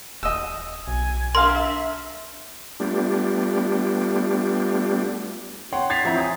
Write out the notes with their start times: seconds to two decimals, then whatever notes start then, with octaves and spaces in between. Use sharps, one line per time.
0.23 D#1 D#5 E6
0.88 B1 G#5
1.35 D4 A#4 E5 F5 C6
2.80 G3 A3 B3 D4 F4 G4
5.72 C#5 F#5 G5 C6
5.90 G#6 A6 B6 C7 F7
6.04 A1 F3 C4 E4 A#5
6.17 G#5 D#6